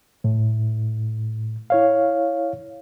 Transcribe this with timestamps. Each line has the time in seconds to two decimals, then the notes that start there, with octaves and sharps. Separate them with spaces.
0.24 A2
1.70 E4 C#5 F5